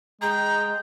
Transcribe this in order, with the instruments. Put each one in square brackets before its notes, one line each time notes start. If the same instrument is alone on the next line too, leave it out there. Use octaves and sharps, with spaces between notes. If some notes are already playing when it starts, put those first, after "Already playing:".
[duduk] G#3 [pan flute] G#4 [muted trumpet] G5 [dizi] A#5